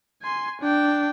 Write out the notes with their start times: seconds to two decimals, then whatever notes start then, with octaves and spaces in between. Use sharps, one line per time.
0.23 G#5 C6
0.61 D4 G5